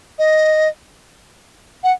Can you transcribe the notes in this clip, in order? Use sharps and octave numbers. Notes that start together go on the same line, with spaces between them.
D#5
F#5